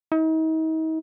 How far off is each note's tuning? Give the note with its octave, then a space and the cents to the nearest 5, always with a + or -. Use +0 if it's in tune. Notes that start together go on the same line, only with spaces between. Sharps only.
D#4 +40